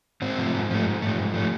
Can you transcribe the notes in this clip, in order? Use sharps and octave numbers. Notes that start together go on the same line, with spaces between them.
G#2 C4
F3 A3
G#2
F3 A3
G#2
F3 A3
G#2
F3 A3